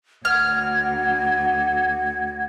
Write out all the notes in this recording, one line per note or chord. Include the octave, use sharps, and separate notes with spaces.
D2 F#4 F#5 F6 G#6